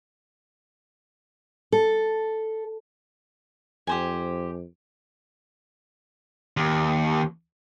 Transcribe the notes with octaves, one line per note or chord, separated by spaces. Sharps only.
A4
F2 G4 C5 G#5
D#2